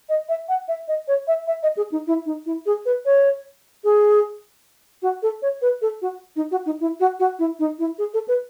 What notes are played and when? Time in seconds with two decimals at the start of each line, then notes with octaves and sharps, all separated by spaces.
0.09 D#5
0.29 E5
0.49 F#5
0.68 E5
0.88 D#5
1.08 C#5
1.28 E5
1.47 E5
1.63 D#5
1.77 G#4
1.92 D#4
2.07 E4
2.26 D#4
2.46 E4
2.66 G#4
2.86 B4
3.05 C#5
3.84 G#4
5.02 F#4
5.23 A4
5.42 C#5
5.62 B4
5.82 A4
6.02 F#4
6.36 D#4
6.51 F#4
6.66 D#4
6.80 E4
7.00 F#4
7.20 F#4
7.39 E4
7.59 D#4
7.79 E4
7.99 G#4
8.14 A4
8.28 B4